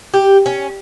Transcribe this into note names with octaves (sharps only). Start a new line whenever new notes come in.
G4
C#4